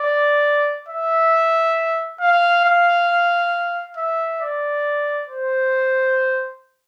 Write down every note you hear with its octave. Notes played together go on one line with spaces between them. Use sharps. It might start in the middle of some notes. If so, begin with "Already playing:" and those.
Already playing: D5
E5
F5
F5
E5
D5
C5